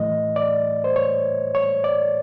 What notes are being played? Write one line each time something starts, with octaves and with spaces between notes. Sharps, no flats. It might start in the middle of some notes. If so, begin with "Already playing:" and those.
Already playing: A2 E3 A3 D#5
D5
C5
C#5
C#5
D5